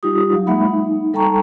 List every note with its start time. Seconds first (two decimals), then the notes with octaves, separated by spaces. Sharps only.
0.03 G3 D#4 F4 G4 D#6
0.33 F#3 F5
0.47 G#3 A#3 D#4 E5 F#5 B5
0.65 D#4
1.13 G3 A4 G5 A5 A#5 C#6